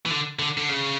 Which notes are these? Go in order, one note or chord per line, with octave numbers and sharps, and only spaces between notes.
E3
D3
D3
D3
C#3